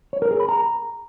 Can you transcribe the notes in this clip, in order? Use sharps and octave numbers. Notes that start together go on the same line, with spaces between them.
C#5
A#4
G#4
B5
A#5